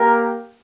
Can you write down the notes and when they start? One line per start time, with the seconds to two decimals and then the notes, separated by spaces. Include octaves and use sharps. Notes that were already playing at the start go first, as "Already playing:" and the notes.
Already playing: A#3 G4 A#4